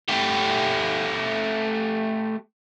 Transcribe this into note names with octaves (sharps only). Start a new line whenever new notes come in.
A3 G4